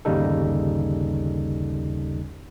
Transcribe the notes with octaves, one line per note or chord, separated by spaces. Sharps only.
G1 D#2 C#3 G3 D#4 A4